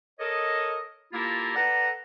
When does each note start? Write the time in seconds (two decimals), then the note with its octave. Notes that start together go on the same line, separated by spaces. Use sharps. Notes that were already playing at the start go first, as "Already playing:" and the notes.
0.19 A4 A#4 C#5 D#5
1.12 A#3 E4 F4 G4 A4 A#4
1.55 A4 B4 D5 F#5 A#5